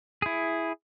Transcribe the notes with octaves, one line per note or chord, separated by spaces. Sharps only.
E4 G#4